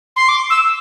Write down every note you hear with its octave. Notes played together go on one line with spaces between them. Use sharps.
C6
D6
E6